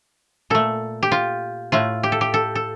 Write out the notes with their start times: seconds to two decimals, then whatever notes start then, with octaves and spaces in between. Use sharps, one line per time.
0.50 A#2 A3 A4
1.03 G4
1.12 F4
1.72 A2 A3 F4
2.03 G4
2.12 A4
2.21 G4
2.34 A4
2.55 A4